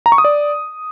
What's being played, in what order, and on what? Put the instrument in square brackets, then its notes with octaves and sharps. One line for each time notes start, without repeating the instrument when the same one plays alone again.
[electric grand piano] A#5
C#6
D#6
D5